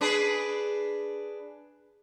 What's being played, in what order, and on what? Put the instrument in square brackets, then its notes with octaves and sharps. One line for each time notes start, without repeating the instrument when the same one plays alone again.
[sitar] D4 G#4 B4